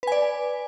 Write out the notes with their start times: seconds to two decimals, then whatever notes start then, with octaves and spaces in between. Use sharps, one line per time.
0.03 B4
0.07 G#5
0.12 D5